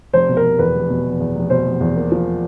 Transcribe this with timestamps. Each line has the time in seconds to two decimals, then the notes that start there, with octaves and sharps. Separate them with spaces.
0.13 F1 C5
0.29 B2
0.37 A#4
0.44 F1
0.59 E2 B4
0.74 F1
0.90 B2
1.05 F1
1.20 E2
1.36 F1
1.50 B2 C5
1.65 F1
1.81 E2
1.96 A#3
2.12 F3